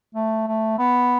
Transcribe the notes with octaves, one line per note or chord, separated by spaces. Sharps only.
A3
A3
B3